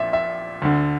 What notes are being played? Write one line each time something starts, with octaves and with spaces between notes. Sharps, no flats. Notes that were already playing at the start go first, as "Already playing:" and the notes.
Already playing: A#1 A#2 E5
E5
D2 D3